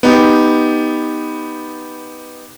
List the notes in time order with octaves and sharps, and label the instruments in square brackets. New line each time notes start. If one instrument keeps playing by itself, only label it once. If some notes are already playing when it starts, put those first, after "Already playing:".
[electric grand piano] B3 D#4 G4